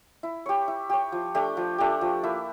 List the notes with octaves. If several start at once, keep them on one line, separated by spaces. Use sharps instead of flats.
E4
G4 C#5
E4
G4 C#5
F3
A3 D4 G4
F3
A3 D4 G4
F3
A#3 E4